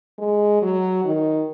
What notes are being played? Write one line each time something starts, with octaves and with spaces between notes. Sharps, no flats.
G#3
F#3
D#3